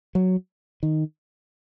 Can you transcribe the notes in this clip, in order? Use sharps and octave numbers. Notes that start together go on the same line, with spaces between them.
F#3
D#3